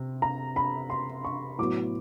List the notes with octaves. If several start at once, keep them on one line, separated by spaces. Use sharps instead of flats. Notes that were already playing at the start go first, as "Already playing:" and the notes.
Already playing: C3
A#5
B5
C6
C#6
A2 F#3 B3 D6